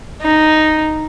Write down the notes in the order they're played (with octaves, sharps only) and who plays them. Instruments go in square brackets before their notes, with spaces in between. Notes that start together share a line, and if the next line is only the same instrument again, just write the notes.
[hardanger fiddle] D#4